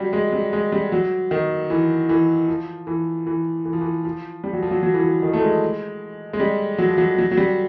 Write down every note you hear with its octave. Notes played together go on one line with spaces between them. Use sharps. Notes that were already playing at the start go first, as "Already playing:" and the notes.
Already playing: F#3 G3
G#3
G3
G#3
G3
F#3
D#3
E3
E3
F3
E3
E3
E3
F3
E3
F3
G3
F#3
F3
F#3
F#3
E3
F3
D#3
A3
G#3
G#3
G3
F#3
F3
F#3
F#3
F#3
G3